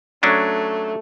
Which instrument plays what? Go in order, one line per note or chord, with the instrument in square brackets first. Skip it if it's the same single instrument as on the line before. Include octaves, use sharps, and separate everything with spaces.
[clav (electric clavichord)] F#3 C#4 D4 [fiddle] A3